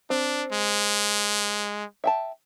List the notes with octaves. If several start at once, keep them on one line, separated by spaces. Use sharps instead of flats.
C4 D4
G#3
E5 G5 A5